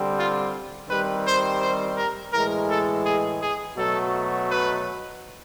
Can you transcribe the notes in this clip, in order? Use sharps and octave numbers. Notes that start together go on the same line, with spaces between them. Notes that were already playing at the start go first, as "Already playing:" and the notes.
Already playing: D3 G3 C4
F4
D#3 G3 C4 B4
C5
C5
A#4
A2 E3 G#3 A#4
A4
G#4
G#4
B2 F#3 A3 A4
B4